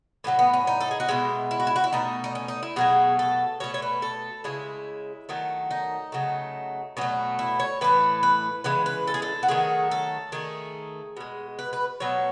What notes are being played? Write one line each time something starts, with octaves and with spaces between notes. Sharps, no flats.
A2 F#3 A3 C#4
B3
C#4
D#4
A4
G#4
F#4
B2 G#3 E4
E4
F#4
E4
F#4
E4
B2 A3 D#4
D#4
C#4
D#4
E4
B2 F#3 A3 G#4
A4
B2 A3 C#5
C#5
B4
A4
C#3 G#3 E4
D#3 F#3 A3
D#4
C#3 F#3 A3
B2 F#3 A3 C#4
E4
C#5
A2 E3 A3 B4
B4
C#3 E3 G#3 B4
B4
A4
G#4
A4
F#4
D#3 F#3 A3 G#4
A4
D#3 A3 G#4
B2 G#3
B4
B4
B2 F#3 A3 C#5